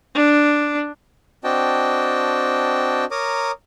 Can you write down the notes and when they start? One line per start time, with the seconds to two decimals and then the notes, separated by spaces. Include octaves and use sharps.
0.15 D4
1.44 C4 D4 F#4 D#5 G5 A5
3.11 A#4 C#5 A#5 D6 D#6